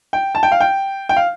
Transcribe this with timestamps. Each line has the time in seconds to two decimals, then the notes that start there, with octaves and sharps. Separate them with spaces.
0.13 G5
0.35 A5
0.43 G5
0.52 F5
0.60 G5
1.09 G5
1.16 F5